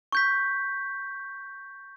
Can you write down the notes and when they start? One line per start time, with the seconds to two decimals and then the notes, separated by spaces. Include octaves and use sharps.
0.12 C#6 G6 B6